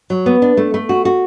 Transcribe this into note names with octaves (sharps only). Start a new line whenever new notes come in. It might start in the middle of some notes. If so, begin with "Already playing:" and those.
F#3
B3
D4
A3
A3
F#4
F#4